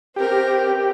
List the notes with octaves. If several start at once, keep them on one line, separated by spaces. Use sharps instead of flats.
C4 G4 A#4